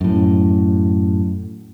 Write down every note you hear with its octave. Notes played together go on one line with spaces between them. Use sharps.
F#2 A2